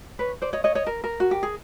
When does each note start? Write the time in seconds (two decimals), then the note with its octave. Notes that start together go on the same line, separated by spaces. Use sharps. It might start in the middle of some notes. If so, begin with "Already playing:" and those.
0.19 B4 C#5
0.42 C5 D5
0.53 C#5 D#5
0.64 C#5 D#5
0.75 C#5 D#5
0.87 A#4
1.04 A#4
1.20 F#4
1.31 G4
1.43 G#4